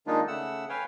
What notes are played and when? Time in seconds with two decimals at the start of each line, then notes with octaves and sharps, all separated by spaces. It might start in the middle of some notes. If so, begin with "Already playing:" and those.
0.07 D#3 G#3 A#3 D4 D#4 F4
0.28 C#3 A3 F#5 E6
0.69 B4 C#5 F5 G5 G#5